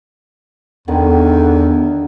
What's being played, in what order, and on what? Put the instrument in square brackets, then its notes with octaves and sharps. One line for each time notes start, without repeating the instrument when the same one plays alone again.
[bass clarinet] E2 [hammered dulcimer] D3 D#3